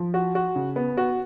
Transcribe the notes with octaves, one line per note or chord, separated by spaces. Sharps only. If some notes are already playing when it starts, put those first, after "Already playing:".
Already playing: F3
F#4
F#4
C#3
B3
F#4